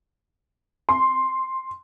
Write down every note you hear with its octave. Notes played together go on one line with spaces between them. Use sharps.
C6